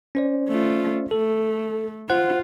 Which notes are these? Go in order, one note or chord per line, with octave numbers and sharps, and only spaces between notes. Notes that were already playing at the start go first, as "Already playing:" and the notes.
C#4 C5 D5
A3 F4
A3 A4
F4 C5 F#5 F#6